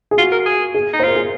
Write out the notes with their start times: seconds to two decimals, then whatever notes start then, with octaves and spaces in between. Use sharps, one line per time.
0.11 G#4
0.18 F4 F#4
0.32 A#4
0.46 G#4
0.74 G#4
0.93 D#4
1.00 C5
1.03 F4 A#4
1.15 G#4